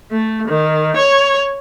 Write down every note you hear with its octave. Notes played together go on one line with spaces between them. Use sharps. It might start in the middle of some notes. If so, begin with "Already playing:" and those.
A3
D#3
C#5